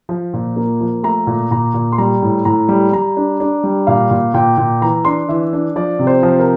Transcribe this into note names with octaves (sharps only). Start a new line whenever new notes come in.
F3
A#2
A#3
F3
A3 A#5
A#2
A#2 A#5
A#2
C6
G3 A#5
A2
A2 A#5
G3
G3 A#5
D4
D4
G3
A#2 F5
A#2
A#2 G5
A#2
E3 A#5
D4 C6
E3 E5
D4
F3 D5
C3
C5
F3
A#4